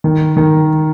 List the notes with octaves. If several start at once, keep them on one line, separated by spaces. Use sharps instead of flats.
D#3
D#3